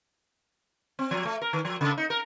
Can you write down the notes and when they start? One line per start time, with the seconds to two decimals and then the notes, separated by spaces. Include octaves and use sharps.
0.99 C4
1.11 F3
1.25 A3
1.42 A#4
1.53 D#3
1.65 F3
1.81 C#3
1.98 D#4
2.10 A#4